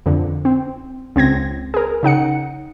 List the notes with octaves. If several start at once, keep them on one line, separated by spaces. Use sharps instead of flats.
F2 D3
C4
C#2 C4 G#6 A#6
G#4 A#4
C#3 D#4 F#5 C#7